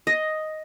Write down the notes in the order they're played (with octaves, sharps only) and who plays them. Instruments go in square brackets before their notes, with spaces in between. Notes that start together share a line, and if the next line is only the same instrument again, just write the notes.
[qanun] D#5